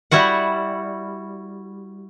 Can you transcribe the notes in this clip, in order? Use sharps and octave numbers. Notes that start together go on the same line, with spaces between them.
G3 E4 F#4 F#5